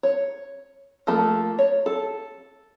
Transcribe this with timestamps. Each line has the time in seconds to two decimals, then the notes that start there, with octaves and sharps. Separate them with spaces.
0.03 C#5
1.07 F3 A3 A#3 A4
1.59 C#5
1.86 A4